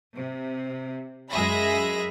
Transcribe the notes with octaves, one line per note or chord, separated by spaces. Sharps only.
C3
F#2 G#3 G#4 E5 B5 A#6